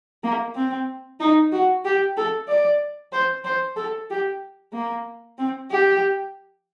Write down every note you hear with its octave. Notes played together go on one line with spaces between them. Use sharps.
A#3
C4
D#4
F#4
G4
A4
D5
C5
C5
A4
G4
A#3
C4
G4